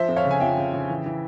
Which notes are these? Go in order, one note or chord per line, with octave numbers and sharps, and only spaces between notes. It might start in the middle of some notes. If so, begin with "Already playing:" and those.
Already playing: F3 C5 E5
F2
C#5 F5
C#3
G#5
F2 E5 G5
C#3
C#3
E3
E3